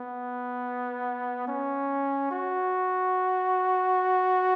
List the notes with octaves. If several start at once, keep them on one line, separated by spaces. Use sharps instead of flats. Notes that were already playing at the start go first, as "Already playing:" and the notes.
Already playing: B3
C#4
F#4